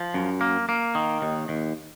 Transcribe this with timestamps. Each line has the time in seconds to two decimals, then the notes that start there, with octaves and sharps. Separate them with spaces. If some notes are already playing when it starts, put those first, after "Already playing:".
Already playing: F3
0.14 F#2
0.41 A#3
0.69 A#3
0.95 D#3
1.22 D#2
1.49 D#2